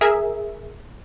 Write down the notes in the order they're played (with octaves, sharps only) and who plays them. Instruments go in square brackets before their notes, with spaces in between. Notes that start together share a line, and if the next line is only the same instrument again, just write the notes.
[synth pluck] G#4 A#4 E5